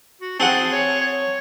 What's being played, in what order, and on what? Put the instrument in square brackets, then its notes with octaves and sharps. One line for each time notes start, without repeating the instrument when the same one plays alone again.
[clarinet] F#4
[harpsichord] C4 G#4 F#5 [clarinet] A5
[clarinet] C#5
C#5